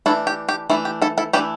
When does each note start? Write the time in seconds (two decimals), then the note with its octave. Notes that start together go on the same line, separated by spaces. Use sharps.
0.06 E3 A3 D4 E4 A4
0.27 G4
0.49 G4
0.70 E3 A3 D4 E4
0.85 G4
1.02 E4 A4
1.18 E4 A4
1.33 E3 A3 D4 G4 B4